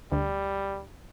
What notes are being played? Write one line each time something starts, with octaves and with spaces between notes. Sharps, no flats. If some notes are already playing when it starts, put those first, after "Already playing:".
D2 G3